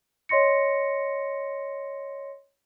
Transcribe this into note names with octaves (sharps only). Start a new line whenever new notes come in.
C#5 D#5 C6 A#6 C#7